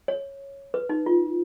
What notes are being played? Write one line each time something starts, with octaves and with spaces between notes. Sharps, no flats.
C#5
B4
D#4
F4